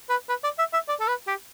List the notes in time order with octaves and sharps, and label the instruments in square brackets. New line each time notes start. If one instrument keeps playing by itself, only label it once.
[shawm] B4
B4
D5
E5
E5
D5
A4
B4
G4